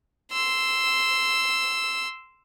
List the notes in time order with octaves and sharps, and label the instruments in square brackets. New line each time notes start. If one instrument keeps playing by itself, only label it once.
[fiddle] C6 E6